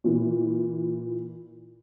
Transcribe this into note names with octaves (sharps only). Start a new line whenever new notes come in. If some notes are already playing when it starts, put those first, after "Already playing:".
A#2 E3